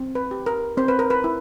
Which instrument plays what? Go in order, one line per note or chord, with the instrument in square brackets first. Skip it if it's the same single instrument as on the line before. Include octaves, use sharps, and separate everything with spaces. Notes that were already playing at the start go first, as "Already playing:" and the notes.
Already playing: [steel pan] C4
B4
G4
A#4
C4 C5
B4
A#4
B4
E4